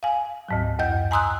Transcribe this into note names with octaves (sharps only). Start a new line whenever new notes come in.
F5 G#5
D2 G#2 F#3
F#2 D#5 F#5 G6
G#5 A#5 C6 D#6 E6 F#6